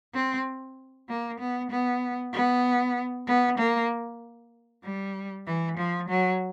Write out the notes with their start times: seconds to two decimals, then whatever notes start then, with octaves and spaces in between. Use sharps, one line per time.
0.14 C4
1.09 A#3
1.40 B3
1.71 B3
2.33 B3
3.27 B3
3.58 A#3
4.84 G3
5.46 E3
5.78 F3
6.09 F#3